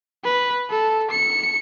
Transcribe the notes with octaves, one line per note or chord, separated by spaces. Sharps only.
B4
A4
C#7